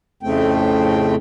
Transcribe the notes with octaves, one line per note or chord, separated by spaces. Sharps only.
F2 A2 C#3 A3 C4 G5